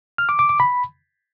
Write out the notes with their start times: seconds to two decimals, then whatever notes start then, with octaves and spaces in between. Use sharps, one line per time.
0.18 F6
0.29 D6
0.39 D6
0.49 D6
0.60 B5